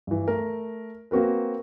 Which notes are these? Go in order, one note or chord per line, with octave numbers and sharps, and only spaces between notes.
G2 E3
A3 A#4
A#3 C4 F#4 A#4 B4